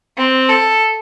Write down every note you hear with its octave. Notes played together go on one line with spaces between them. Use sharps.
C4
A4